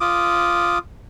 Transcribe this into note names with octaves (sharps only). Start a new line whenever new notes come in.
F4 D6 D#6